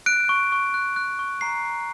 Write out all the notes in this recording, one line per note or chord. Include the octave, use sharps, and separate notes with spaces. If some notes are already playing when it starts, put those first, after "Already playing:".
F#6 D7
C#6
C#6
F#6
F#6
C#6
A#5 C7
A#5